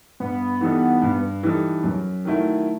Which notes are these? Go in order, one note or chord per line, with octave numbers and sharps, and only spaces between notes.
G2 B3
E3 G3 D#4 A4
G2
E3 G3 D#4 A4
F#2
D#3 F#3 A3 E4